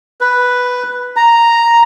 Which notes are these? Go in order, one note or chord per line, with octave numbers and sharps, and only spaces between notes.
B4
A#5